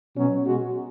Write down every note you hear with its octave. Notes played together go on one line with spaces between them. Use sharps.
B2 F#3 C#4
B2 G#3 F#4